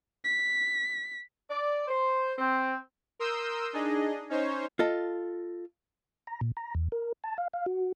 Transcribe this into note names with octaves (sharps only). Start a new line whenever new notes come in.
B6
D5
C5
C4
A#4 C6 D#6 E6 G6
D4 D#4 G#4 D#5
C#4 D#4 C5 C#5
F4 A4 D#5
A#5
A#2
A#5
E2
A#4
A5
F5
F5
F#4